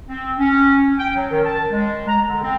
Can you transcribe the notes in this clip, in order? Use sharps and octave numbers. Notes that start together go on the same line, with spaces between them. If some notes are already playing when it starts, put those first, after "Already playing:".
C4
C#4
G5
F#3
D#3
A5
G#3
A#5
D3
C4